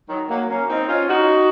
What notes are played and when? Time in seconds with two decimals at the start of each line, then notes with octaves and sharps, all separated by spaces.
0.09 D#3 F#3
0.29 F#3 A#3
0.49 A#3 C#4
0.70 C4 D#4
0.89 C#4 F4
1.09 D#4 F#4